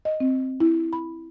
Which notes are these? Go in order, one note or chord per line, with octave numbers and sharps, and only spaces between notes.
D#5
C4
E4
B5